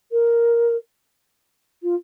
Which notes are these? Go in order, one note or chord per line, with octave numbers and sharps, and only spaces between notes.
A#4
F4